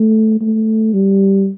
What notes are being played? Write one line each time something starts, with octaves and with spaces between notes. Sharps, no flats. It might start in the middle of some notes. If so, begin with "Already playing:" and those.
Already playing: A3
A3
G3